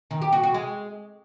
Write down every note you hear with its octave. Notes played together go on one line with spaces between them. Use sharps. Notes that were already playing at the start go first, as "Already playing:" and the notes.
D#3
G4
F#4
F#4
G#3